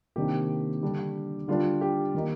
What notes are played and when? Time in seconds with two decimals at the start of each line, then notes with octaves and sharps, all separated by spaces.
0.16 C3 D#3 A#3 D4 G4
0.82 D3 G3 D4
1.48 D3 G3 D4 F4
1.81 G4
2.15 D#3 A#3 D#4